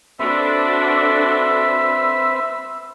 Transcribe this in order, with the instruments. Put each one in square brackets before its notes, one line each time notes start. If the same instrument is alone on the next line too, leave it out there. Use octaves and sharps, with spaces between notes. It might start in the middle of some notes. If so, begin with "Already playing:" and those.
[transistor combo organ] C4 B4 [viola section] D4 F#4 A4 [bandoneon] E5 [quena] E6